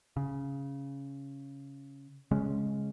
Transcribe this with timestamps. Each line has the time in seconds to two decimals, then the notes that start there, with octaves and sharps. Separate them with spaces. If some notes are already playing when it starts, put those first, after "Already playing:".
0.17 C#3
2.31 C#3 G#3 C#4